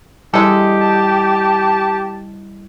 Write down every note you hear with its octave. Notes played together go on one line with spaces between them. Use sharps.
G3 G#3 E4 G4 A4 D#5
A5